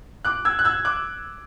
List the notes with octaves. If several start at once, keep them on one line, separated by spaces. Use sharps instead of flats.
D6 F#6
E6 G#6
F#6
E6 G#6
D6 F#6